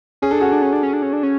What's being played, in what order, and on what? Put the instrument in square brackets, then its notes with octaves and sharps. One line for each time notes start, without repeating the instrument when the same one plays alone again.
[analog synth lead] C#4 [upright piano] G#4
[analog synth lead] D4 [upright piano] A4
[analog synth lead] C#4 [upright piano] F#4 G#4
[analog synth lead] D4
C#4
D4
C#4
D4
C#4
D4
C#4